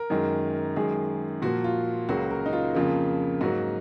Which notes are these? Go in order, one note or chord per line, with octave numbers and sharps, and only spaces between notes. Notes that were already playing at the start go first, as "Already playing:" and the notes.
Already playing: A#4
F#2 D#3 G#3
F#2 D#3 G#3 G#4
A#2 F3 A#3 F#4
F4
C#2 C#3 F#3 A#3 F#4
A#4
D#4
F4
F2 C#3 F3 A#3
G#2 F#3 A#3 F#4